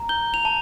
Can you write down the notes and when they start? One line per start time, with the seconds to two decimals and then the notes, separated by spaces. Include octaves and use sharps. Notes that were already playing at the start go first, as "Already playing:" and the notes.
Already playing: A#5
0.09 G6 G7
0.34 F7
0.45 A5